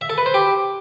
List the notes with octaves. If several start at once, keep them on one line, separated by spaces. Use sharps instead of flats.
E5
A4
B4
C5
G4